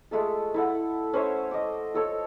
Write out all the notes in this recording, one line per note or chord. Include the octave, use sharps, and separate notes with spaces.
G#3 A3 F4 A4
E4 A4 F#5
C#4 C5 C#5 E5
D#5 D6
F4 A4 C#5